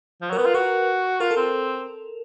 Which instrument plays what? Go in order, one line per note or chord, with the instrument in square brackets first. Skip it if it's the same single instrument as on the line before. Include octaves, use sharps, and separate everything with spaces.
[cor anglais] F3
[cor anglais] F#3 [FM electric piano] A#4
[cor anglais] B3 [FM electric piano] B4
[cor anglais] F4
[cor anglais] F#4 [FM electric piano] A#4
[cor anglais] F4 [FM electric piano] A#4
[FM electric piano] A4
[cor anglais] C4